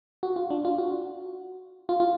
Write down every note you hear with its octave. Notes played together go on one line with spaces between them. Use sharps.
F#4
F4
D4
F4
F#4
F4
F4